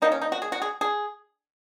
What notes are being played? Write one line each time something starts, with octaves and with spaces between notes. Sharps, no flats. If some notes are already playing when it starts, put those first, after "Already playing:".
D#3 F#3 A#3 D#4
C#4
D#4
F#4
G#4
F#4
G#4
G#4